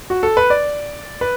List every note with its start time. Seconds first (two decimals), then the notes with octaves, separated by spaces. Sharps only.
0.10 F#4
0.23 A4
0.37 B4
0.50 D5
1.21 B4